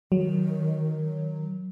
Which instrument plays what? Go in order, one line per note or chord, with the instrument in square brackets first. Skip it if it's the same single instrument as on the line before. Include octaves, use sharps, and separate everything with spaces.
[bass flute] D#3 [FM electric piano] F#3